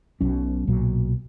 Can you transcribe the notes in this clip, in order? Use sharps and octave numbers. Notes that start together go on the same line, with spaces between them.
B1 B2 F#3 C#4
B1 A#2 F#3